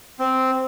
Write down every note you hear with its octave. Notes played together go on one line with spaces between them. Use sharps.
C4